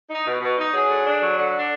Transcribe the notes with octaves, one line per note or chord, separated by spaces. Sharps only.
D#4
B2
B2
D#4
F#3 G#4
D3
D4
F#3
D3
D4